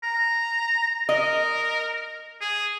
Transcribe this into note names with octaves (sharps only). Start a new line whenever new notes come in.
A#5
A#4 D#5
G#4